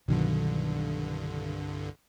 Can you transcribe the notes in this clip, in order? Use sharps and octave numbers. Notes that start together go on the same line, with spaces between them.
C2 G2 B2 D3 D#3 F#3